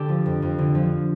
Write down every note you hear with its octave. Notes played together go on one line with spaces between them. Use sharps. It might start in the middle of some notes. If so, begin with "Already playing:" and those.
Already playing: D3 G4 A4
F3
F2
F2
D3
F3